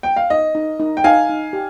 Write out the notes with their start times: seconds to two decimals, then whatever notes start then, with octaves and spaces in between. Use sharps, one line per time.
0.03 G5
0.16 F5
0.30 D#4 D#5
0.55 D#4
0.80 D#4
0.97 G5
1.04 D#4 F5 G#5
1.30 D#4
1.53 G4